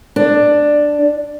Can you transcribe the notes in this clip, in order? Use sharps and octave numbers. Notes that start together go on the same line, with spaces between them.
D4